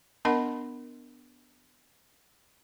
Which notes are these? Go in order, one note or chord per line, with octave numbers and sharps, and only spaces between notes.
B3 D4 A#4 D#5 F#5 B5